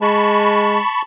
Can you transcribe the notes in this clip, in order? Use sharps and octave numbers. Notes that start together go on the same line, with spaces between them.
G#3 A5 B5 C#6